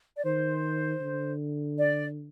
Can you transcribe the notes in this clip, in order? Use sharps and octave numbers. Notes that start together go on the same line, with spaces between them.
D5
D#3 C5
D3
D5